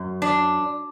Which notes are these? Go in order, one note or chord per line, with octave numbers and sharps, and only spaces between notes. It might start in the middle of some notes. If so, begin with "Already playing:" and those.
Already playing: F#2
D4